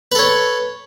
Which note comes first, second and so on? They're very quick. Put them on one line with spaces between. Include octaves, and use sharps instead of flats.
B4 A4 C#5